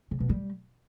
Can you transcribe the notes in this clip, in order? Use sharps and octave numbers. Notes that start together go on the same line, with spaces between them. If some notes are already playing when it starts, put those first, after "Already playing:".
C#3
B2
G3